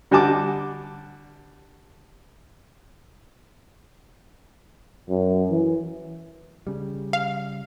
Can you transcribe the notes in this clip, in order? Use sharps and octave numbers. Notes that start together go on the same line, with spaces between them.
D3 G3 F#4 G#5 A5 D6
F#2
E3
C#3 G3
F5